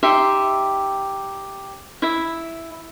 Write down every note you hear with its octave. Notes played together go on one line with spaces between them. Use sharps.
D#4 G4 E5 C6
E4 E5